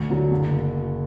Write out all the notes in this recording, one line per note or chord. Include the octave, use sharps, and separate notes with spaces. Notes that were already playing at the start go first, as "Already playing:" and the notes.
Already playing: D2
D3 F#3
F#1